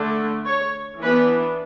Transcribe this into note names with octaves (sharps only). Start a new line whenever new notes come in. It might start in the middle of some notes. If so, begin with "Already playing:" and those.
Already playing: D3 A3 D4
C#5
E3 B3 D4 B4